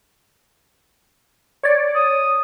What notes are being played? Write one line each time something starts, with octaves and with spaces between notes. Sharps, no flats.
C#5 D5
D#6